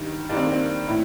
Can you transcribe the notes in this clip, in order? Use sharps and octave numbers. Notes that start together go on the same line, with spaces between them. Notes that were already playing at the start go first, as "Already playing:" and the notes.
Already playing: G2 D#3
G2 D#3 D4
C4
A#3
C4
A2